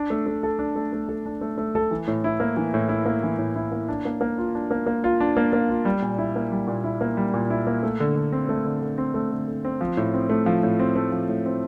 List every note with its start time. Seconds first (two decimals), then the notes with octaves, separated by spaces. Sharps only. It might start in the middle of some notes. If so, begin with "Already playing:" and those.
Already playing: D4
0.10 A3
0.26 A3
0.43 A4
0.59 D4
0.76 A3
0.93 A3
1.09 A4
1.26 D4
1.41 A3
1.58 A3
1.75 A4
1.91 E3
2.07 A2
2.24 E4
2.40 A#3
2.57 E3
2.74 A2
2.89 E4
3.05 A#3
3.23 E3
3.38 A2
3.56 E4
3.72 A#3
3.88 D4
4.05 A#3
4.21 A#3
4.38 F4
4.55 D4
4.71 A#3
4.86 A#3
5.04 F4
5.20 D4
5.37 A#3
5.53 A#3
5.69 F4
5.85 G3
6.02 A#2
6.18 E4
6.36 A#3
6.52 G3
6.67 A#2
6.84 E4
7.01 A#3
7.17 G3
7.34 A#2
7.50 E4
7.67 A#3
7.83 A3
8.00 D3
8.16 D3
8.33 C4
8.49 A3
8.65 D3
8.82 D3
8.98 C4
9.14 A3
9.32 D3
9.48 D3
9.65 C4
9.81 F3
9.97 A2
10.14 C4
10.30 A3
10.46 F3
10.63 A2
10.80 C4
10.96 A3
11.12 F3
11.29 A2
11.46 C4